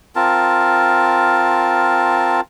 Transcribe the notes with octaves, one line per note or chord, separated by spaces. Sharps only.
C4 F4 A#4 A5